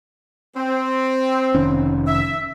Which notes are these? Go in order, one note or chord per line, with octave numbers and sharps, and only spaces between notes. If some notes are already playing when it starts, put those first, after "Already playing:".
C4
F1 D#3 C#4
E5